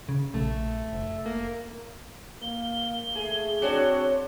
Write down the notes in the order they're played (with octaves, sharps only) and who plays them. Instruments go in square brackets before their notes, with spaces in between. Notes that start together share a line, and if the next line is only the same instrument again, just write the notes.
[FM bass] C#3
[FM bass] A#1 [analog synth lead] A3
[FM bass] F1
[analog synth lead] A#3
[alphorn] A#3 [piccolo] G7
[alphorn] A3 [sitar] G#4
[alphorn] C4 [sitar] D4 F#4 G#4 [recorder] C#5